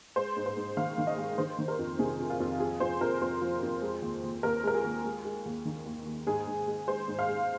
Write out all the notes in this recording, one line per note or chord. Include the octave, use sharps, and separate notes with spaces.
G#3 C5
G#2
C5
G#2
D#3 F5
D#3
D#5
G#3
D#3 C5
D#3
A#4
F2
C3 G#4
F2
F4
F2
F3 G#4
F2 C5
F2 A#4
F2 C5
F3
F2
G#3
D#2
D#2
D#2 A#4
G#3 A#4
G#4
D#2
G#3
G#3
D#2
D#3
D#2
D#2
G#2 G#4
G#2
G#3
G#3 C5
G#2
F5
G#3